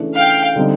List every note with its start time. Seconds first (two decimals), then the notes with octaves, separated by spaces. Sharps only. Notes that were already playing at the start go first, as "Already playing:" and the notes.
Already playing: C#3 E3 A3 D4
0.16 F5 G5
0.56 D3 G3 C4 D#4